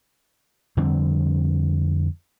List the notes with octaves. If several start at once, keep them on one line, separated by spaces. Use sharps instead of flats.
F2 D3 G3 C4